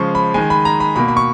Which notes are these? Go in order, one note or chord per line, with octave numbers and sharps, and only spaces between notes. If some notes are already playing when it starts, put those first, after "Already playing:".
Already playing: C#3 F3 G#3 C#6
B5
D#3 G#3 G#5
B5
A#5
B5
B2 A#3 B5
B5
C#6